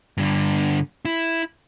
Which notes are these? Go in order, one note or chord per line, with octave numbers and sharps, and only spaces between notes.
G2 D3
E4